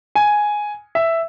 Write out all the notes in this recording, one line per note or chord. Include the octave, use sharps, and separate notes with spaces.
G#5
E5